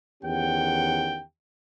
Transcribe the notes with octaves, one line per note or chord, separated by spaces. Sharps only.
E2 D#3 C#4 G4 F#5 G5